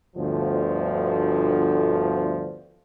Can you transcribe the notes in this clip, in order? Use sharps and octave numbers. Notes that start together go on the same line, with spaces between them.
G1 D2 F3